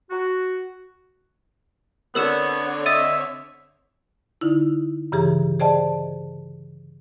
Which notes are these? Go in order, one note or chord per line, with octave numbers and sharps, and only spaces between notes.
F#4
D3 B3 C4 A#4 C#5 E6 E7
D#5 E5 D#6 A6 D#7
D3 D#4 E4
G2 C#3 E3 G4 G#4 A#5
G#4 C5 D5 D#5 G5 A5